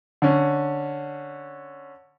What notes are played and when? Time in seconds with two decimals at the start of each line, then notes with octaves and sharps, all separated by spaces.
0.22 D3 C#4